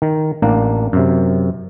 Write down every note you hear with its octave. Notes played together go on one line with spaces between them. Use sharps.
D#3
A1 A#3 D4
F#2 C3